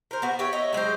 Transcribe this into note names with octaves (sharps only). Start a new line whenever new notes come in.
A#4 C5
B3 F#4
G4 B4 C#5 E5
C#5 D#5 E5
F#3 G#3 G4 C5